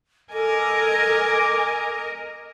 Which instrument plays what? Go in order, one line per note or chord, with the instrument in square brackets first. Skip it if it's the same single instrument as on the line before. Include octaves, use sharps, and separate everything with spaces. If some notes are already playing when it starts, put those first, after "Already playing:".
[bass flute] A4 [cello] A#4 D#5 [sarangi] G#5 [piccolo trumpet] D6